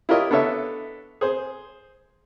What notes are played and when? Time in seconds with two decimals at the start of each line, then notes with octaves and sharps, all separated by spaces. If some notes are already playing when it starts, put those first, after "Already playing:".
0.09 E4 F4 G4 A#4 C#5 D#5
0.31 B3 D4 A4 C#5 E5
1.21 G#4 C5